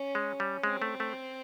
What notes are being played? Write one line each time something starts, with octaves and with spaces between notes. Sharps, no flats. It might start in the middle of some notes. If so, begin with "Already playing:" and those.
Already playing: C#4
G#3
G3
G#3 C4
A3
A3